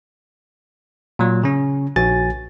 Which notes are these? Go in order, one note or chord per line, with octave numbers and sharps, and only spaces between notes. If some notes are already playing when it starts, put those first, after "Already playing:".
A#2 F#3
C#3 C#4
A#1 F#4 G#5 A6